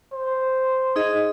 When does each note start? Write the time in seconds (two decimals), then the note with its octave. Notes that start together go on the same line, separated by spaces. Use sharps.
0.13 C5
0.96 D#4 G#4 D#5